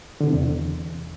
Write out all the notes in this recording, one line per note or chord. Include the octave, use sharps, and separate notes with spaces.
D3
C3
E2